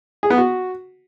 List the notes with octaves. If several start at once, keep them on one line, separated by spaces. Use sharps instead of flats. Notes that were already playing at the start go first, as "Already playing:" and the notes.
G#4
B3
F#4